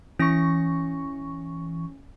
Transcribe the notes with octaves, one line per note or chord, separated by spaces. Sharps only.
E3 C#4 C#6 A#6